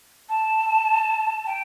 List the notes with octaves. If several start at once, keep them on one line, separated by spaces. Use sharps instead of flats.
A5
G5